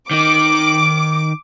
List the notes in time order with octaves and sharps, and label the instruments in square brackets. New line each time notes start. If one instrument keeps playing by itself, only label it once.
[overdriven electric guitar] D#3 D#4 [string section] D6